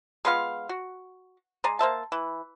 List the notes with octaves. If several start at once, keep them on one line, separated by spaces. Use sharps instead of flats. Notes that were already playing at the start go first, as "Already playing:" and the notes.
G#3 B3 F4 F5
F#4
G#3 D5 G#5 A#5
A#3 C5 E5 A5
E3